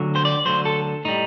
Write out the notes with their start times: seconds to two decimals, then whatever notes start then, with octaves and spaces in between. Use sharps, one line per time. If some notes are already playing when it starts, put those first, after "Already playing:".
Already playing: D2 D3 F#3
0.16 C5
0.25 D5
0.45 D2 D3 F#3 C5
0.65 A4
1.05 A2 G3 D#4